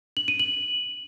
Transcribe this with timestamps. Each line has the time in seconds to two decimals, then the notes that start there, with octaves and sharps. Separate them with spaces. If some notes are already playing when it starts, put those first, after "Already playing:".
0.17 F#7
0.28 D#7
0.39 F#7